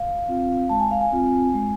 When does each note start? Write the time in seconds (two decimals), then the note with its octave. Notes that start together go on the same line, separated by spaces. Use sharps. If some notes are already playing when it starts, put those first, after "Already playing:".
Already playing: F5
0.28 C4 F4
0.69 G#3 A5
0.80 G#5
0.91 F5
1.01 G#5
1.12 C4 F4
1.54 G#3